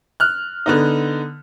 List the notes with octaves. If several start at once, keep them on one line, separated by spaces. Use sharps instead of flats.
F6 F#6
D3 B3 D#4